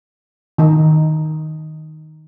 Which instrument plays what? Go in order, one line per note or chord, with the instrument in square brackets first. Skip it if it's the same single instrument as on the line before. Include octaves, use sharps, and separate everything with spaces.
[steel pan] D#3 D#4